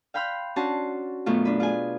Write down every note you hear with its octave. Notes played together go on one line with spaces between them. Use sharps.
F5 G5 B5 C6 F6 F#6
C#4 D4 F#4 A5 C6
F#2 B2 A3 F4
D4 B4
F4 G#4 G#5